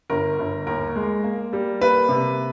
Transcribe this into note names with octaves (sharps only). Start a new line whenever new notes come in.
G1 A#4
G1
D#2 A#4
G#3
A#3
G3
A#3 B4
C3